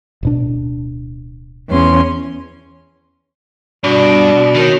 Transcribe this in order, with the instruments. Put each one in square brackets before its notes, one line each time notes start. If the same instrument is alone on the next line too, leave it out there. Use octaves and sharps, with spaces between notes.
[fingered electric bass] D1 B2 D4
[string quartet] E2 C#4 C6
[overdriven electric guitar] G2 [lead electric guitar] B2 [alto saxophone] D4 [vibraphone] F#4
[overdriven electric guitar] D#3 [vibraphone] F#4 A#4 C#5